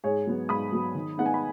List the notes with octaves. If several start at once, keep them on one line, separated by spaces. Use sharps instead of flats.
G#2 G#4 C#5
F#3 B3
G#2 B5 D#6
F#3 B3
D#3
B3 D#4 F#5
G#5
B5